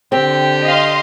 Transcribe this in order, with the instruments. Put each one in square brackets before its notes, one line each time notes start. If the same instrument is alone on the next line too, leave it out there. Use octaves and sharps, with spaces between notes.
[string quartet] D3 G4 [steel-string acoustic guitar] C4
[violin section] D#5 F5 C6